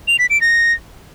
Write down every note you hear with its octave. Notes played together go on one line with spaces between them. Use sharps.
F7
B6
D7
A#6